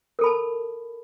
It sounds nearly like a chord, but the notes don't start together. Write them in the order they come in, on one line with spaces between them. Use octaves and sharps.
A#4 A4 B5 A5